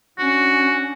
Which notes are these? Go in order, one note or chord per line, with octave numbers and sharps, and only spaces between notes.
C#4 D4 F#4